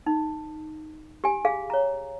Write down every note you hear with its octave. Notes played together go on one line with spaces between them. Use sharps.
D#4
G4 G#5
G#4 F5
C#5 A#5